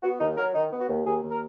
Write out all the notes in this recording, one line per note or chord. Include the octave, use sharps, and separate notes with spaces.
B3 F#4
D#2 D#4
F#3 A#4
D#3 D#4
B3
F#4
D#2
D#2 G#4
D#2
A#4